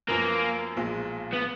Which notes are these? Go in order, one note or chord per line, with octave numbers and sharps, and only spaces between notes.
F#2 F3 A#3 B3
B1 A#2 F3 G#3
B3